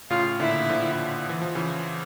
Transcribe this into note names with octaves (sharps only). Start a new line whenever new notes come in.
A2 C#3 F4
A#2 D3 E4
D3 F3
E3
F3
C#3 E3